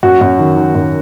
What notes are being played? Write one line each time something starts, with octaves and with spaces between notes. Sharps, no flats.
F#2 F#4
F#2
D#3
D#3
F#2